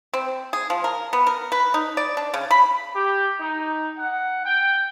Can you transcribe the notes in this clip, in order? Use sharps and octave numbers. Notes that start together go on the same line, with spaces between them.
C4
G#4
F3
A#4
B3
A#4
B4
D#4
D5
D4
C#3
B5
G4
D#4
F#5
G5